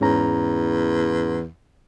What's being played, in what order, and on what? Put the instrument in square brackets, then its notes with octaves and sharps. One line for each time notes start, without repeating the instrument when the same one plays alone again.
[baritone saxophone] E2 [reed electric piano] G#2 C#4 A#5